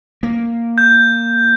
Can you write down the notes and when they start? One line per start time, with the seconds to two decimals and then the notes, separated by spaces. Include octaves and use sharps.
0.23 A#3
0.78 G6